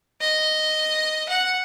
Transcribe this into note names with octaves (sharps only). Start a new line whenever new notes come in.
D#5
F#5